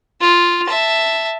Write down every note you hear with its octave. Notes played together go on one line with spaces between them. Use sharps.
F4
E5 A5